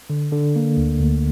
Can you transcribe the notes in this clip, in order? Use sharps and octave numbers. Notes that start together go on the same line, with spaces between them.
D3
D3
A#3
D2
D2